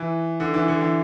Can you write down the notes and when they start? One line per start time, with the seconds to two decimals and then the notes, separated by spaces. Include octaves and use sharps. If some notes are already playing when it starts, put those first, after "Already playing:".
Already playing: E3
0.40 D3
0.54 E3
0.68 D3
0.81 E3